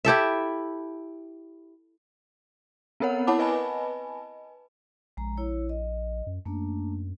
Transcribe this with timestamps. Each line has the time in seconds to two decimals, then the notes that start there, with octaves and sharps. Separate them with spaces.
0.05 E4 G4 A4 E5
3.00 B3 C4 A#4 C#5 F#5
3.27 E4 C#5 F#5 A5 B5 D6
3.39 B4 D#5 G#5 A5 B5
5.17 A#1 G#3 A#5
5.38 E4 C#5
5.69 D#5
6.27 F#2
6.45 F#2 A3 A#3 D4